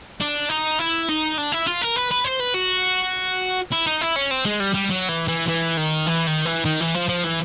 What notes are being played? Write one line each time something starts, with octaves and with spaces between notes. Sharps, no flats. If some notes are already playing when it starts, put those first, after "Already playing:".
D4
D#4
E4
D#4
D4
E4
F4
A#4
B4
B4
C5
B4
F#4
E4
D#4
E4
C#4
C4
G#3
G3
G3
F#3
E3
E3
E3
D#3
E3
D#3
E3
D#3
E3
F3
F3
E3